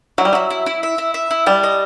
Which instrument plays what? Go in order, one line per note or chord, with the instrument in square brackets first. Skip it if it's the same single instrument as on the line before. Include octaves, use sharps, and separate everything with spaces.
[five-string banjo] F#3 [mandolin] E4
[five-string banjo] G3
[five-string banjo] F#3 [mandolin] E4
[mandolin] E4
E4
E5
E4
E5
E4
[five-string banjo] G3 [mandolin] A5
[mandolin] D#5